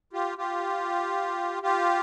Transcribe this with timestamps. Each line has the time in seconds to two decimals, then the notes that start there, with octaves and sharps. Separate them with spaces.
0.13 F4 G4
0.38 F4 G4
1.63 F4 G4